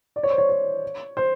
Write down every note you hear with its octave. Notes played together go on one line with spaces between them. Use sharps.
D5
C#5
C5
C#5
C#5
C5